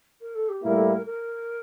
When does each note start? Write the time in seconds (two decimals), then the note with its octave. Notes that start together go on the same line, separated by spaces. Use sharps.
0.21 A#4
0.35 A4
0.49 G4
0.63 A2 G3 A#3 E4 A#4
0.77 A4
0.92 A#4
1.06 A#4